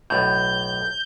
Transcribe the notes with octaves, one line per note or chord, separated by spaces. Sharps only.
B1 A2 G6